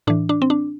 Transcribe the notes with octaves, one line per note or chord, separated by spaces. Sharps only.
A2 E3 D4
D4
C4
D4